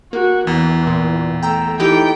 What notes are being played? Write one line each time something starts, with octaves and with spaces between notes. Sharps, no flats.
A#3 F#4
E2 E3
A#2
A3 G5 A#5 E6
E3 D#4 G4 A4 G5